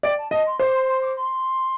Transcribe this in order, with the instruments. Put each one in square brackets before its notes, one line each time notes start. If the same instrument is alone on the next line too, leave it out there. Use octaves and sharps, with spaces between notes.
[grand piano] D5 [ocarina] G5
[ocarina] A5
[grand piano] D#5 [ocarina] A5
[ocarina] C6
[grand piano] C5 [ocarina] D6
[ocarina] C6
C6
D6
C6